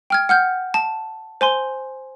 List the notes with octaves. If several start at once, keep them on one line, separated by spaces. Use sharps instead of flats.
G5 F6 G#6
F#5 F6 G6
A5
C5 G#5 C6